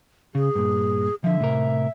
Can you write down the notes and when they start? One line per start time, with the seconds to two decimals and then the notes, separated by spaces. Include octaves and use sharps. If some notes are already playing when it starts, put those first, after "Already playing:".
0.35 C#3 G#4
0.55 G2 A#2
1.24 D3 F3 E5
1.40 A2 C3 A#4